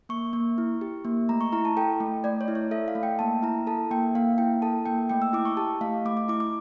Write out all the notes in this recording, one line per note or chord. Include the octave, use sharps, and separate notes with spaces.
A#3 C#6
A#3
E4
G4
A#3
A3 A#5
C#6
E4 A#5
A5
A4 G5
A3
A3 D5
C#5
E4
C#5
A4 E5
F5
A3
G5
A#3 A5
E4 A#5
A4 A5
A#3 G5
A#3 F5
E4 G5
A4 A5
A#3 G5
A3 G5
E6
E4 D6
C#6
G4 A5
A3 F5
A3 D6
D6
E4 D6
D6